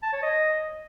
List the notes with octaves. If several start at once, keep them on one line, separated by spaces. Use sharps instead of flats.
A5
C#5
D#5